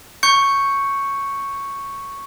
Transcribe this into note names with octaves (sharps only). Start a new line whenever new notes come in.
C#6 G6 C#7